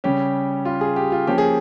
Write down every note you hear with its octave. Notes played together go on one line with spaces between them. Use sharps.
C#3 G3 C#4 G4
F4
G#4
G4
F4
F3 A#3 C#4 G4
G#4